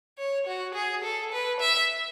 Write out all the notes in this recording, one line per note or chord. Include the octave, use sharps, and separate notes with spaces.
C#5
F#4
G#4
A4
B4
E5